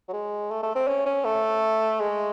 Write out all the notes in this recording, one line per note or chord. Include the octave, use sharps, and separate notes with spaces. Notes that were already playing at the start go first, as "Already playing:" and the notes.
F#3
G#3
A3
A3
C4
C#4
C#4
A3
G#3